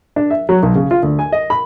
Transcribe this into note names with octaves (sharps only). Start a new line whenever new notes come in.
D4
E5
F#3
B1
C#3
F4
D2
G#5
D#5
B5